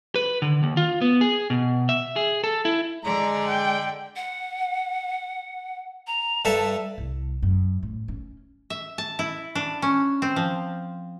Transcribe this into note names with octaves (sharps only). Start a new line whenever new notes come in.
B4
D3
D#2
F4
B3
G#4
B2
E5
G#4
A4
E4
D3 G#3 D5 A#5
G5
F#5
A#5
G2 A4 E5 A5
C2
F#2
A2
C#4
E5
A5
E4
D4
C#4
C4
F3